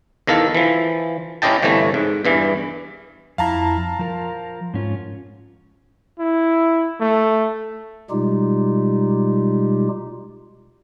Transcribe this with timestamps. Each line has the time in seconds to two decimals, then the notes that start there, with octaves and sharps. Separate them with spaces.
0.27 E2 D#3 A4 F5
0.55 E3 F3
1.42 C#4 E4 G4 D#5 G5 A5
1.62 G1 C3 E3 A3 C#5
1.94 G#2
2.25 E2 G2 E3
3.38 F2 E4 F5 A5 A#5
3.99 F3 A#4
4.74 G#2 C#4 F4
6.19 E4
7.01 A3
8.10 B2 G3 G#3 D#4 F4 G4